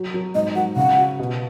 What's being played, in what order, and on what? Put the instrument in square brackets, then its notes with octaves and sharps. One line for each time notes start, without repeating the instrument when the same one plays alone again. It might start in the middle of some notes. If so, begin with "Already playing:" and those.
Already playing: [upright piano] F#3
F#3
[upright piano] G#2 [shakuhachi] D#5
[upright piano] F#3 [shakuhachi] F#5
[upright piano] C#3 [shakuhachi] F#5
[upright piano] F#4
B2